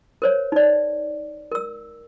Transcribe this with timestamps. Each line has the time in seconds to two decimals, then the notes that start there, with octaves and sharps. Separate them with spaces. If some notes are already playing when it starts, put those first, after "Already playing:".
0.22 A#4 C5 C#5
0.52 D#4 D5
1.52 A#4 E6